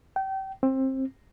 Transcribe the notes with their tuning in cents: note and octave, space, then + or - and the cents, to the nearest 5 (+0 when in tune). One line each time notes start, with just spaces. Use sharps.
G5 -30
C4 +20